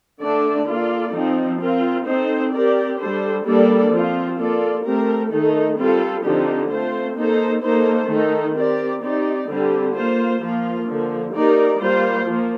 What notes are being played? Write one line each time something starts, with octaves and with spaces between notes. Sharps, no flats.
D3 A3 D4 A4 D5
A#3 F4 A4 D5
F3 C4 D#4
C4 F4 A#4
C4 D#4 A4 C5
C4 G4 A#4 D5
G3 D4 A4 C5
G3 A#3 D4 A4 D5
F3 C4 F4
A#3 F4 A4 D5
A3 C4 G4 A#4
D#3 A3 D#4 A4
G3 C4 F4 A4
D3 F3 C4 D#4 G4
A3 C4 F4 C5
A#3 D#4 A4 C5
A#3 D#4 A4 C5
D#3 A3 D#4 A4
C4 G4 A#4 D5
C4 D#4 G4 D5
D3 G3 C4 G4
A#3 F4 C5
F3 A#3 F4
D3 F3 A#3
A#3 D#4 G4 A#4 D5
G3 A#3 F4 C5
F3 A#3